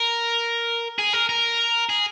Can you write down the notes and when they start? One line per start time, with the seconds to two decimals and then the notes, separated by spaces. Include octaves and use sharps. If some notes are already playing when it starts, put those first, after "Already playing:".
Already playing: A#4
0.99 G#4
1.13 A#4
1.29 A#4
1.90 G#4